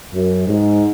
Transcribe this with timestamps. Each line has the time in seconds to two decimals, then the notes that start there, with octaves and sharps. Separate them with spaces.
0.12 F#2
0.46 G#2